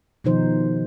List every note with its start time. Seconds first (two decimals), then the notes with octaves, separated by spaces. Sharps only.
0.24 B2 D#3 F3 D#4 C5